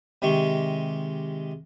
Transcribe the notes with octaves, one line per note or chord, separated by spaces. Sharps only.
C3 D#3 G#3 G4 C#6